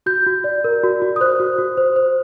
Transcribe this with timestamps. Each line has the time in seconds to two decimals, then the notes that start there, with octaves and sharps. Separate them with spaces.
0.06 F#4 G6
0.26 F#4
0.44 D5
0.64 A#4
0.83 F#4
1.02 F#4
1.16 D#6
1.21 C5 F#6
1.40 F#4
1.58 F#4
1.77 C5
1.96 C5